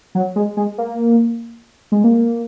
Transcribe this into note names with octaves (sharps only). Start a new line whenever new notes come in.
F#3
G#3
G#3
A#3
G#3
A#3